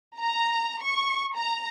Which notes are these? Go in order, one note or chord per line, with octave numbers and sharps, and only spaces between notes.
A#5
C#6
A#5